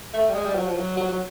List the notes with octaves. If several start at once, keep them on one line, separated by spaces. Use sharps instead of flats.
A3
G3
G#3
G3
F#3
F3
F#3
F#3
F#3